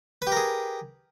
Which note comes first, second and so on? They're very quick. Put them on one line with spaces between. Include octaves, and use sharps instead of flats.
B4 G4 A#4 G#4